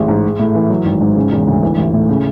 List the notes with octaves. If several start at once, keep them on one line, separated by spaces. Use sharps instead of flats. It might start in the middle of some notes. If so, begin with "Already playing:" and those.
Already playing: A1 G#3
G#2
G#3
A2
E3
F#3
G#1
G#2
C#3
E1
D2
E3
A1
A2
C#3